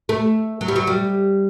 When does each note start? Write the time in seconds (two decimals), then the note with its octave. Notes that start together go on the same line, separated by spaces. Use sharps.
0.09 A3
0.61 F#3
0.68 G3
0.76 F#3
0.87 G3